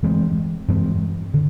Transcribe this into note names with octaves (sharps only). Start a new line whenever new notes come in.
G2 E3 G#3 C4
G2 E3 G#3 C4
D3